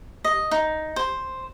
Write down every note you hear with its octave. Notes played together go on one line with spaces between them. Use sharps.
D#5
D#4
C5